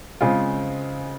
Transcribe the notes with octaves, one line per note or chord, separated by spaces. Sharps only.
C#3 G#3 C4 F4